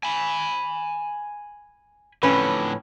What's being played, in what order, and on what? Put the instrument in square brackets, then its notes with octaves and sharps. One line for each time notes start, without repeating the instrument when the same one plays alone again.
[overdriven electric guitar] G#5 B5
[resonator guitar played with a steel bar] F2 C#4 B4 [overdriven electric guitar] A2 D3